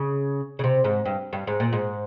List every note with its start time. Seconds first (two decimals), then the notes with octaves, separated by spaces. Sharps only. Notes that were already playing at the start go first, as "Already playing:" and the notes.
Already playing: C#3
0.59 C#3
0.64 C3
0.84 G#2
1.06 G2
1.33 G2
1.47 G#2
1.60 A#2
1.73 G#2